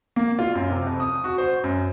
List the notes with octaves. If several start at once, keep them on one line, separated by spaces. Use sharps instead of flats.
A#3
F4
F#2
C3
F2
D#6
F#4
C5
F#2